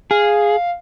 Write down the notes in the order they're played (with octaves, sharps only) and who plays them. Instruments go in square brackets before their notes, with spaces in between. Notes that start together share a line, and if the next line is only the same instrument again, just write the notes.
[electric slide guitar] G#4 [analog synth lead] F5